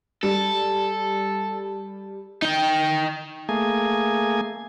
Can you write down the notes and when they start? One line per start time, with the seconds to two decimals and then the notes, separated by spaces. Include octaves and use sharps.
0.23 G3 A4
2.42 D#4 G5
3.49 A3 A#3 G#4 G#5